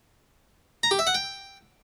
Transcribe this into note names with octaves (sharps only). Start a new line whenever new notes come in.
A#5
G4
E5
F#5
G5